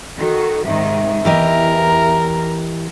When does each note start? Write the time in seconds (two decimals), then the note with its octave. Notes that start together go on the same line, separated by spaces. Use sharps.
0.19 D#3 F#4 A4
0.65 G#2 C3 D#3 E5
1.25 E2 E3 G4 A#4 D#5